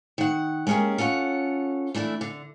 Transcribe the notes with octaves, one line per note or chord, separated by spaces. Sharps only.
D#3 F#5
G#3 A#3 C#4 G4 G#4
C#4 F4 A4 F#5
E3 A3 D4 E4
D3